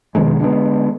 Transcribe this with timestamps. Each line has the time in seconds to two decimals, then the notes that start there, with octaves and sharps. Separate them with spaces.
0.15 F1 B2 D#3 G#3
0.40 D3 G#3 A#3 B3